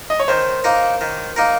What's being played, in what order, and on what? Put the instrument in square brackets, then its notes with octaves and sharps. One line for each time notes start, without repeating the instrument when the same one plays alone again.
[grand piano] D#5
C#5
[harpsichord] D#3 [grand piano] C5
[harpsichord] A#3 D#4 A#4
D#3
A#3 D#4 A#4